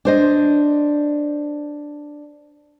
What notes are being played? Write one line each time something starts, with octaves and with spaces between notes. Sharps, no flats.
D4 C5 D#5